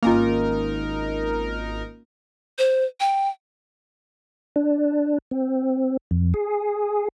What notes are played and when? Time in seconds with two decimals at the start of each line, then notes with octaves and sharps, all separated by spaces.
0.03 G#1 A#3 C#4 D#4 F4 A#4
2.58 C5
3.00 G5
4.56 D4
5.31 C4
6.11 F2
6.34 G#4